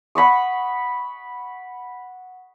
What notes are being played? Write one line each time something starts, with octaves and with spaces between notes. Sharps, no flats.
F#5 B5 C#6 D#6